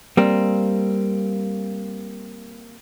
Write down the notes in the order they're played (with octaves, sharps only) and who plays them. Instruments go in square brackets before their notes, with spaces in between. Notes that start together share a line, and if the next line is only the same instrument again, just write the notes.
[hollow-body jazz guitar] G3 A#3 C4